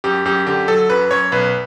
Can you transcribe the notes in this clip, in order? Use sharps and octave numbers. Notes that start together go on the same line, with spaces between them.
F#2 G4
F#2 G4
D3 G4
F#3 A4
F#2 B4
F#2 C#5
B1 B4